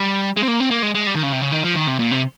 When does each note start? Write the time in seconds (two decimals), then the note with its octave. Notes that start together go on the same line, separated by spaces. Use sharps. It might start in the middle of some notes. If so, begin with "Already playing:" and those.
Already playing: G3
0.36 G#3
0.43 C4
0.48 A#3
0.60 C4
0.71 A#3
0.82 G#3
0.94 G#3
1.07 G3
1.15 D#3
1.23 C#3
1.33 C3
1.42 C#3
1.52 D#3
1.64 F3
1.76 D#3
1.88 C3
1.99 A#2
2.11 C3